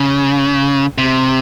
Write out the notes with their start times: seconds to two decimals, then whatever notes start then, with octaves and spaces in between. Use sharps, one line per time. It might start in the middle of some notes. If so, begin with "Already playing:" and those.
Already playing: C#3
0.98 C3